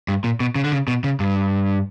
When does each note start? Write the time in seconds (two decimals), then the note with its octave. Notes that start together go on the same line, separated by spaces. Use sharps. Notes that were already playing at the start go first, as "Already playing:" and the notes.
0.08 G2
0.24 A#2
0.40 B2
0.55 C#3
0.64 D3
0.72 C#3
0.88 B2
1.04 C#3
1.20 G2